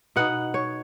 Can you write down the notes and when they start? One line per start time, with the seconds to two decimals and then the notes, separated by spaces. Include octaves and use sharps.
0.16 B2 B3 D#4 F#5
0.54 C#5